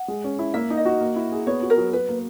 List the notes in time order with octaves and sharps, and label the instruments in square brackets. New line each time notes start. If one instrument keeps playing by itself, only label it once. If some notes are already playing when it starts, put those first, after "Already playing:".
Already playing: [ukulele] F#5
[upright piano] G#3
C#4
E4
[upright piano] A#3 [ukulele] E5
[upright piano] D#4
[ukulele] D#5
[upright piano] F#4
A#3
E4
G#4
[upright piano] B3 [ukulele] C#5
[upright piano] F#4
[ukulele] A#4
[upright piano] F#3
[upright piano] F#3 [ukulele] B4
[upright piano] A#3